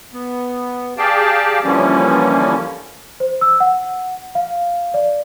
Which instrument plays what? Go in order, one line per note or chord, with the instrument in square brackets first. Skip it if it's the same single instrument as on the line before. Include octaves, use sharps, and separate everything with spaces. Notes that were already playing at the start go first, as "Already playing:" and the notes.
[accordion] B3
G4 G#4 D5 F5 G5 A5
D3 E3 F3 G3 A#3 C#4
[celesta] C5
E6
F#5
F5
D5